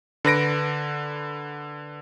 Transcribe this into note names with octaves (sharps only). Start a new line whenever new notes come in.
D3 B4 A#6 D7